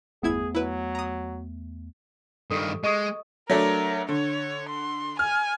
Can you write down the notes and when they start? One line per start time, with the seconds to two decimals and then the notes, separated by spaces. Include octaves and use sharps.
0.23 G1 E2 A3 B3 E4 G#4 G#6
0.55 F#3 E4 B4
0.95 A#5 D#6
2.51 G2 D#3 G4 A4
2.84 G#3 D#5 C#6 D#6
3.50 F#3 A3 D4 A#4
4.09 D3 C#5
4.69 C6
5.19 G#5 F6